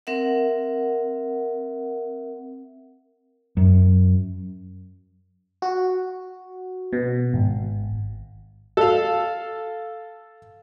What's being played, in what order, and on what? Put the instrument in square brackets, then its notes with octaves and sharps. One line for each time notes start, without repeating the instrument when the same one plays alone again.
[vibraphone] C4 A#4 E5 F#5
[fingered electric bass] F#2
[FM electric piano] F#4
B2
G#1
[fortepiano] A4 F5